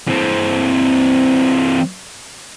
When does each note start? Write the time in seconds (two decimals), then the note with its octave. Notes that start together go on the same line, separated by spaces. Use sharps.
0.07 E3 C4